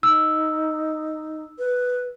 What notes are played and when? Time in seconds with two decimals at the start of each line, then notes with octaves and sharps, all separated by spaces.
0.03 D#4 E6
1.59 B4